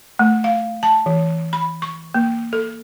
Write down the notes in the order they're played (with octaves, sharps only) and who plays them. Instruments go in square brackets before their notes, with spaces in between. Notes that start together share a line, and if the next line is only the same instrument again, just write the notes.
[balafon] A3
F5
A5
E3
B5
C#6
A#3
A4